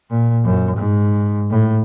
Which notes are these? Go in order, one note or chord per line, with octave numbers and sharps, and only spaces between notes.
A#2
F#2
G#2
A2